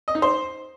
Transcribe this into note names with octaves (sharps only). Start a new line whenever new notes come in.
D#5
D#4
C5